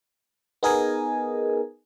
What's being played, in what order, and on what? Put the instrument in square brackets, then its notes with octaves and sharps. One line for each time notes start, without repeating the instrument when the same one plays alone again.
[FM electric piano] B3 D#4 G#4 A#4 D#5 G#5